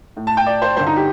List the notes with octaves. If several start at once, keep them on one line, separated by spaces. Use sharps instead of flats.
A2
A5
G5
D5
C5
G2 D3 C5
D#4
G4